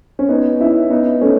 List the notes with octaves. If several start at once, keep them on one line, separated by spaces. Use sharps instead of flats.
C#4
B3 D#4
C#4 E4
B3 D#4
A3 C#4